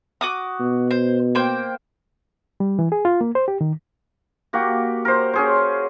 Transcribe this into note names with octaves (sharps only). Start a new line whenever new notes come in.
F#4 D6 D#6
B2
C5
A#3 C5 G5
G3
E3
G#4
F4
A#3
C5
G4
D#3
A#3 F#4 G4
A#4 C5
C#4 G#4 C5